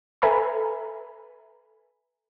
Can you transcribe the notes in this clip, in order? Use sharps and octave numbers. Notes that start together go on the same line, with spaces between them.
A4 B4 E5 G#5 A#5 B5